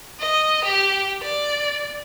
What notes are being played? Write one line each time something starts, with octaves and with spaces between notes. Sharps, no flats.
D#5
G4
D5